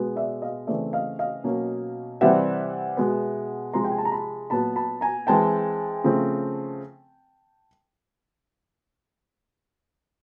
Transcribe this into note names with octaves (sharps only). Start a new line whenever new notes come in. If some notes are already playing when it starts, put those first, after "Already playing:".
Already playing: B2 G#3 B3
D5 E5
D#5 F5
C#3 E3 A3 C4 D5 E5
D#5 F5
D#5 F5
B2 F#3 A#3 C#4
C3 E3 G3 C4 E5 F#5
B2 G#3 B3
C3 F3 G#3 A#5 C6
G5
G#5
A5
A#5
A5 B5
A#2 F#3 B3 A5 B5
A5 B5
G#5 A#5
E3 G#3 C4 G5 A5
C#3 F3 A3 C4